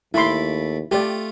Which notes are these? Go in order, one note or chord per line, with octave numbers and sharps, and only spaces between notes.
D#2 A3 E4 B5 C6 D6
A3 F4 G4 D5